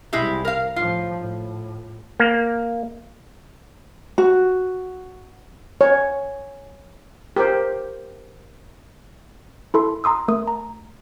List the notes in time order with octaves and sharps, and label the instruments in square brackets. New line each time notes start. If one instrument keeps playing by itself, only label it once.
[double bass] C2 [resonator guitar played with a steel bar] G#3 E4 G4
[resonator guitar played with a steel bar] A#4 F5
[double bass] A2 F3 [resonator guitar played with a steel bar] F4
[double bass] A2
[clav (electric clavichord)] A#3
[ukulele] F#4
[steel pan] C#5
G4 A#4 C5
[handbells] E4 A4 C6
A#5 C6 D#6 E6
A3 A#4 D#6
A#5